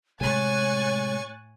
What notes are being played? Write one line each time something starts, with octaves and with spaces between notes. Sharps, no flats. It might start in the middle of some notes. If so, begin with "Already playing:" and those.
A2 C3 G#3 C#5 G#5 C#6 F#6 A6